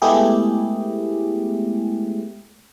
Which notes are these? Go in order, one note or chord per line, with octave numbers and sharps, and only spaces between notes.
G#3 A3 B3 E4 G4 G#4